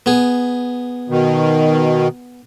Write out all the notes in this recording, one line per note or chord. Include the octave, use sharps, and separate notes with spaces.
B3 G#4
B2 D#3